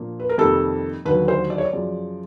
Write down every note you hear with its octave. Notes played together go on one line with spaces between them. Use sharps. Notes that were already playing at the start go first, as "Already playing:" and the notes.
Already playing: A#2 F3 A#3 D4
B4
A#4
F2 C3 D#3 G3 A#3 A4
D#2 D3 F#3 B4
C5
D5
C#5
D5
F#2 C#3 F3